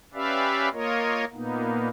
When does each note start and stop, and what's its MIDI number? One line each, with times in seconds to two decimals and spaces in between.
0.14 0.69 61
0.14 0.69 67
0.14 0.69 71
0.14 0.69 74
0.14 0.69 76
0.14 0.69 77
0.73 1.25 58
0.73 1.25 65
0.73 1.25 70
0.73 1.25 73
0.73 1.25 75
1.34 1.89 46
1.34 1.89 58
1.34 1.89 59
1.34 1.89 63